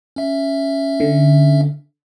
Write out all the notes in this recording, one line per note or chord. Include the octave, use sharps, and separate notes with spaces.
C#4 E5
D3